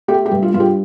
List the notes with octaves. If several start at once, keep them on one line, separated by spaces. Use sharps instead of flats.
A3 G4
G4
G2
F4
G2 F4
G4